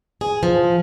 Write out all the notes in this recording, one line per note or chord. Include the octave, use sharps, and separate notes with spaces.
G#4
F3